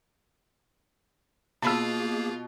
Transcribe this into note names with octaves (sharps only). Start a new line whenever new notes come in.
B2 A#3 F4 G#4 A5 B5 E6